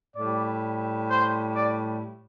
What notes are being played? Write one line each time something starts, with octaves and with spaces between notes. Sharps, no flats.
A2 G3 D5
C5
D5